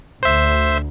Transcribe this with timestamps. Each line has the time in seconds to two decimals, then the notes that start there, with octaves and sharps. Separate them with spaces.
0.23 D2 C5 E5